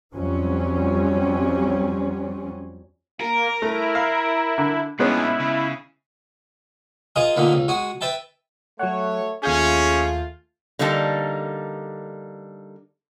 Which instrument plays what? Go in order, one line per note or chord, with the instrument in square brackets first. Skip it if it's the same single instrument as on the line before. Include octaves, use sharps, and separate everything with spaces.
[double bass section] F2 F#3 G3 C4 C#4
[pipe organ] A#3 [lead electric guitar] A#4
[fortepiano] A3 [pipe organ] E4
[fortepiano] F5
D3
[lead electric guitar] A#2 D4 [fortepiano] G#3 B3 C#4 [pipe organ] E4
[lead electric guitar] C#3
[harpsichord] F4 G#4 A#4 D#5 A#5
A#2 D3 D#3 A#3
C#2
G#3 F#4 D#6
B4 E5 G5 A5
[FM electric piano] F#3 F#5 [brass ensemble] A3 C#5
[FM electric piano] D#2 F5 G6 [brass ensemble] A3 F4 [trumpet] C#4 [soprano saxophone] G#4
[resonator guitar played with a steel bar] D3 G3 A#3 D#4 A4 A5